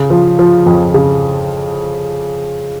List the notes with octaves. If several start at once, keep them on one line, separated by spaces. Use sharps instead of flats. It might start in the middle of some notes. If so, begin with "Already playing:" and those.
Already playing: C#3
F3
F3
F2
C#3